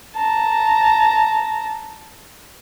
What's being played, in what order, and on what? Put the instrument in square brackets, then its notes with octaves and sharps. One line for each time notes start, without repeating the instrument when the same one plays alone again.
[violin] A5 A#5